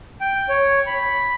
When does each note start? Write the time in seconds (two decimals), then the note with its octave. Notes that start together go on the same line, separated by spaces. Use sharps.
0.21 G5
0.49 C#5
0.87 B5